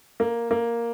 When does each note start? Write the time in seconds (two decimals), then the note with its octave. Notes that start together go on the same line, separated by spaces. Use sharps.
0.20 A#3
0.51 A#3